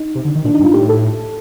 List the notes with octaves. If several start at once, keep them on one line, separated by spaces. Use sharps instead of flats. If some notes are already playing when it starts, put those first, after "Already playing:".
Already playing: D#4
C3
D3
D#3
A#2 D4
D#4
G2
F4
A2 G4
A4